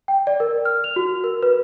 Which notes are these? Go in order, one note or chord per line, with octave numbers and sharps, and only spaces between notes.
G5
D5
A#4
F6
F7
F#4
A#4
B4